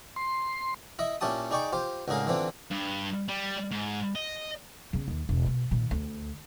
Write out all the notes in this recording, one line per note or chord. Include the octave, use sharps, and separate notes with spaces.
C6
E4 D#5 E5
A#2 C#4 E4 G4 A5 D#6
D#4 G#4 D5 G5 C#6 D6
F4 G4 C5
C#2 A2 D3 G#4 A#4 F5
D3 E3 C4 D4 F4
G2
G3
G#2
D#5
C#3 B3
D#2
E1
B2
A#2 D#3
D2